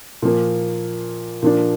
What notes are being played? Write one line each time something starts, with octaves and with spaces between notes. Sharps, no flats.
A#2 F3 A#3
A#2 F3 A#3 D4